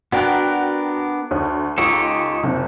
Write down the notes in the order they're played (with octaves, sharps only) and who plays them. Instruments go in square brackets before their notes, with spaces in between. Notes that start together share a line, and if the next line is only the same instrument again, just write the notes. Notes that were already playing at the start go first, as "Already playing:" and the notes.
[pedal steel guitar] B3 D4 A#4 [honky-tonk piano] F#4 G5 F#6
[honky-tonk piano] D2
[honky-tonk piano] C#2 C#6 [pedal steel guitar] D#4 G4 A4
[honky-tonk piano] F#1 C3